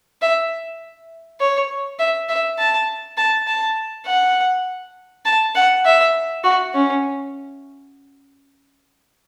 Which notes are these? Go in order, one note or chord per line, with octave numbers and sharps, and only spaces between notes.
E5
C#5
E5
E5
A5
A5
A5
F#5
A5
F#5
E5
F#4
C#4